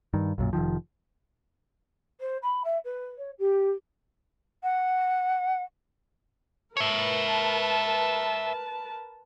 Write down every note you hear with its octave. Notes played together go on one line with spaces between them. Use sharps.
G2 D#3
B1 F#2 A#2
F1 D#2 D#3 F3
C5
B5
E5
B4
C#5
G4
F#5
A#4 B4 C#5 E5 A5